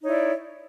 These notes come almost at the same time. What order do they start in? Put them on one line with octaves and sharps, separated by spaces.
D#4 C#5 E4 D5